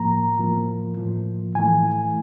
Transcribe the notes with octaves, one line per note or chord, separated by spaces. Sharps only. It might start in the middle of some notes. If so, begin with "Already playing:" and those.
Already playing: A2 F3 A#3 A#5
A2 F3 A#3
A2 F3 A#3
A2 E3 A3 G#5